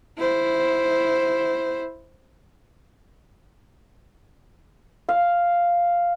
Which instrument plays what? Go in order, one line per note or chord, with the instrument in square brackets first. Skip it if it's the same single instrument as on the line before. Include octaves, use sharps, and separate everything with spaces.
[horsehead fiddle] E4 C5
[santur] F5